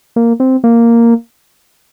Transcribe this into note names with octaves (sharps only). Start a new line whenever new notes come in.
A#3
C4
A#3